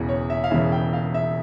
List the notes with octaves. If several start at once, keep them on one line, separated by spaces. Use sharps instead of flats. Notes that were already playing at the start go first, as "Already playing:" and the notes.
Already playing: E1 E2 C#3 E3
C#5
E5
F5
E1 E2 C#3 E3 E5
G5
F5
E5